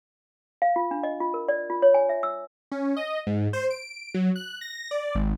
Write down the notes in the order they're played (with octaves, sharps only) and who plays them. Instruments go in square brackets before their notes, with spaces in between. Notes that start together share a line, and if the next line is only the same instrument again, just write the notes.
[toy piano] F5
F4
D4
D#5
F4
A#4
D5
F4
C#5
G#5
E5
E6
[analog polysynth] C#4
D#5
G#2
C5
D7
F#3
F#6
A#6
D5
G#1